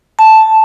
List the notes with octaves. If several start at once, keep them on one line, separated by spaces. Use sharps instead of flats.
A5